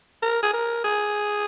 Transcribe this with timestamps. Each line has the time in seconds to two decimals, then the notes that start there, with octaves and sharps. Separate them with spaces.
0.22 A#4
0.43 G#4
0.53 A#4
0.84 G#4